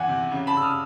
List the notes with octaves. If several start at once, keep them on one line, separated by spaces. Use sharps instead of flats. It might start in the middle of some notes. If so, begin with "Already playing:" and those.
Already playing: E2 F#5 G#5
C3
C#3
A5 B5
C#3 E6
D#6 F6